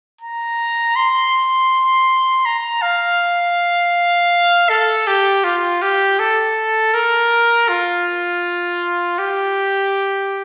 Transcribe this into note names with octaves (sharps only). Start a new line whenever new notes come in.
A#5
C6
A#5
F5
A4
G4
F4
G4
A4
A#4
F4
G4